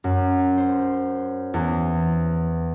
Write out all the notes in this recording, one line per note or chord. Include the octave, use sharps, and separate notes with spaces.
F#2
C5
E2